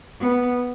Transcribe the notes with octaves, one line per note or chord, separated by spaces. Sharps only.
B3